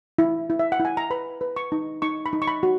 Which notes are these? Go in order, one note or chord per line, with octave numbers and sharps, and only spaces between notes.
E4
E4
E5
F#5
E4
G#5
A#5
B4 B5
B4
C#6
D#4
D#4 C#6
B5
D#4
C#6
B5
F#4